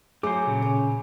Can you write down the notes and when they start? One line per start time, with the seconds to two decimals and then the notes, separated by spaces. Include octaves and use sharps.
0.23 F#3 A3 G#4 C5 D6
0.47 A#2 C#3
0.62 C#4